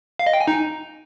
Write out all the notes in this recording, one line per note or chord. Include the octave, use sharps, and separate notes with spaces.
F5
D#5
G5
G#5
D#4